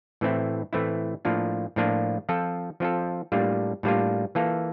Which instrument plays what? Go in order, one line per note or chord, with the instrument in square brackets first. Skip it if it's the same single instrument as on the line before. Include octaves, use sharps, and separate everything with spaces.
[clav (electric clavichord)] A2 E3 A3 C4 E4
A2 E3 A3 C4 E4
A2 F3 A#3 D4 F4
A2 F3 A#3 D4 F4
F3 C4 F4 A4
F3 C4 F4 A4
A2 G3 A#3 D4 F4
A2 G3 A#3 D4 F4
E3 A#3 F4 A4